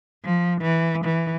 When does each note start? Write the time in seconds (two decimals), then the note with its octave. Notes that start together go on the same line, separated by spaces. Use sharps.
0.24 F3
0.61 E3
1.05 E3